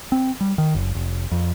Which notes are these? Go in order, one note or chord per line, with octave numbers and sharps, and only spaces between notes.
C4
G3
D#3
F#1
F1
F2